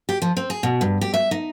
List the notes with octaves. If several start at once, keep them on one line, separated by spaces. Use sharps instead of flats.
G4
F3
C4
G#4
B2
G2
G4
E5
D#4